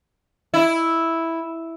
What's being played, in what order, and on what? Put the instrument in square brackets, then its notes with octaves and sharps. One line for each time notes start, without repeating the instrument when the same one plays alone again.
[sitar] E4